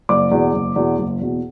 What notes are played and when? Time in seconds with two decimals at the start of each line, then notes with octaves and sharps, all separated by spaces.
0.09 F#1 D5 D6
0.31 E2 B2
0.53 F#1
0.76 E2 B2
0.98 F#1
1.20 E2 B2